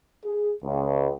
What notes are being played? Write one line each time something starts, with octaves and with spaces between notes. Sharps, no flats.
G#4
C#2